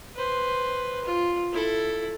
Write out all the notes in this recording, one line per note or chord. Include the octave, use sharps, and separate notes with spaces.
B4 C5
F4
E4 A4